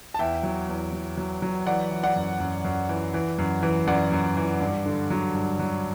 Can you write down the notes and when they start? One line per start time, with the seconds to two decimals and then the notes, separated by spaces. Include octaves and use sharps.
0.14 A5
0.19 E2 E5 G5
0.43 F#3
0.69 E2
0.93 F#3
1.17 F#3
1.42 F#3
1.66 E3 D5 F#5
1.91 E3
2.03 D5 F#5
2.16 F#2
2.40 F#2
2.65 F#2
2.89 E3
3.14 E3
3.38 F#2
3.63 E3
3.88 F#2 D5 F#5
4.12 F#2
4.37 E3
4.61 G2
4.86 D3
5.10 F#3
5.35 G2
5.59 F#3